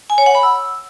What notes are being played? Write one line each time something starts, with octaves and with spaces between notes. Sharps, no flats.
G#5
C#5
F#5
B5
E6